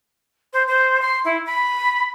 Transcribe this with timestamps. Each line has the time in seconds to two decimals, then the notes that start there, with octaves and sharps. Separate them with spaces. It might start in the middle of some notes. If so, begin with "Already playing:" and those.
0.53 C5
0.68 C5
1.02 C6
1.24 E4
1.46 B5